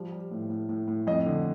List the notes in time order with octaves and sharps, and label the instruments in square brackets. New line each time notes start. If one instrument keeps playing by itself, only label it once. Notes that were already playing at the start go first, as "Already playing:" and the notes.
Already playing: [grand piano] F3 G3
G3
A2
A2
A2
A2
F2 D#5
D3